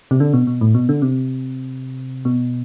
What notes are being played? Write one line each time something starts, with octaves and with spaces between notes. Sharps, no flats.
C3
D3
B2
B2
A2
B2
D3
C3
B2